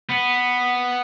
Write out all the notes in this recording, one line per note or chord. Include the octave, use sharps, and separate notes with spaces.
B3